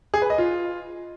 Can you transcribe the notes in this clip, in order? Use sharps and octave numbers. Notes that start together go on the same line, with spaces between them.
G#4
B4
D#5
F4